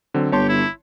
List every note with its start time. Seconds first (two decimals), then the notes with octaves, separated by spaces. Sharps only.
0.14 D3 F#3 C4
0.32 G1 G4 C#5 A5 C6
0.49 E4